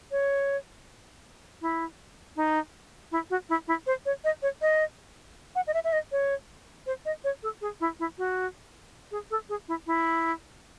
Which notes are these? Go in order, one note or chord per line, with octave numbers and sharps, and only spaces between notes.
C#5
E4
D#4
E4
F#4
E4
E4
C5
C#5
D#5
C#5
D#5
F#5
D#5
E5
E5
D#5
C#5
C5
D#5
C#5
A4
G#4
E4
E4
F#4
G#4
A4
G#4
E4
E4